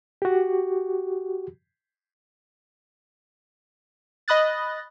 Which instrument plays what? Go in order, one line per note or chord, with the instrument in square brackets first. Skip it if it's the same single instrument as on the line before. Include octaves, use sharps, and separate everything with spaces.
[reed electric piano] F#4 G4
[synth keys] D#5 B5 D#6 F#6 A6